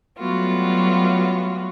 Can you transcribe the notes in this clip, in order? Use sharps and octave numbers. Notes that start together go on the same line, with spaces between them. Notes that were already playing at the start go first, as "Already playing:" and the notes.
F#3 G3 A3 B3 F4 F#4